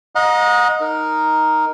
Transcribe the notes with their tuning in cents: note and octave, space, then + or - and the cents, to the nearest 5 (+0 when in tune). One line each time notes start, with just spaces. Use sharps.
D#5 +0 F#5 -40 A#5 +25
D#4 +0 A#4 +0